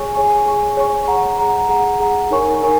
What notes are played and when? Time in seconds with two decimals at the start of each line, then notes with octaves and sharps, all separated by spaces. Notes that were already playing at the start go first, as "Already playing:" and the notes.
Already playing: G#4 C#5 G#5 C#6
0.14 G#4 C#5 G#5 C#6
0.46 G#4 C#5 G#5 C#6
0.77 G#4 C#5 G#5 C#6
1.08 G#4 F#5 A#5
1.39 G#4 F#5 A#5
1.69 G#4 F#5 A#5
2.00 G#4 F#5 A#5
2.31 D#4 A#4 C#5 G#5 C#6
2.62 D#4 A#4 C#5 G#5 C#6